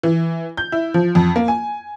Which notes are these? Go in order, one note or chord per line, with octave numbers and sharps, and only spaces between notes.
E3
G6
E4
F3
F2
A#3
G#5